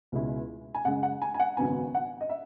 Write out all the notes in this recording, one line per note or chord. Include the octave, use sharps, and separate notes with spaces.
C#2 B2 G#3 C#4 E4
G#5
F#2 C#3 G#3 C#4 F#5
F#5
G#5
G#5
F#5
G#1 F#2 C#3 F#3 B3 G#5
F#5
D#5
E5